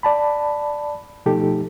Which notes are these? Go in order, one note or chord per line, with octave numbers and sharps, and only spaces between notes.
D5 A5 B5
B2 F3 A3 D#4 G4 A4